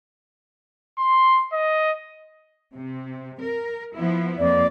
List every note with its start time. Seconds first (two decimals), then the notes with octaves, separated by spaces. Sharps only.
0.98 C6
1.53 D#5
2.73 C3
3.41 A#4
3.95 F3 B3 E4
4.38 F2 A#3 D5